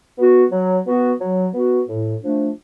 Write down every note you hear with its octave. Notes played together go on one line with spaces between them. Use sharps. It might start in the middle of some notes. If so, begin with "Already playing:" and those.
B3 F#4
F#3
B3 F#4
F#3
B3 F#4
A2
F3 A3 D4